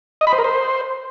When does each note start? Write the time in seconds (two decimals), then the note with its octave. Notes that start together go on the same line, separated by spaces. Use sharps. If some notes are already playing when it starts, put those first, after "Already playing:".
0.21 D#5
0.27 B5
0.33 C5
0.39 A#4
0.44 C5